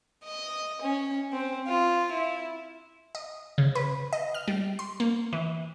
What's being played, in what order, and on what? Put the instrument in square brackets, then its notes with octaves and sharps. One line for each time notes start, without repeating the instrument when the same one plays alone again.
[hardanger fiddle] D#5
C#4
C4
F4
E4
[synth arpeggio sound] D#5
C#3
B4
D#5
F6
G3
C6
A#3
E3